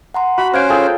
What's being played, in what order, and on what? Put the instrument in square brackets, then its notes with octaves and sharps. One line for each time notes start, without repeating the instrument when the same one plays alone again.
[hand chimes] F#5 A#5 C6
[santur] F#4 [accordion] B5
[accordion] C#4 C5 [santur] F5 [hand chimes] F#6 G#6 D7
[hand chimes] F4 C#5 F5 [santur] G#4 A4 G5